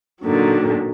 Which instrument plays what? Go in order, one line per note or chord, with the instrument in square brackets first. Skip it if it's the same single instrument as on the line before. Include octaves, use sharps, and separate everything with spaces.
[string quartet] A#2 D3 D#3 F#3